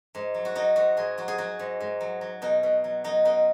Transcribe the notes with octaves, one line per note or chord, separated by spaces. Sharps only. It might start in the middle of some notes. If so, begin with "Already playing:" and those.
G#2
F#3
F#4
F#3 D#4
G#2 F#4
G#2 G#4
F#3 F#4
G#4
F#3 F#4
G#2
G#2
F#3
F#3
B2 D#4
B2
F#3
F#3 D#4
B2 D#4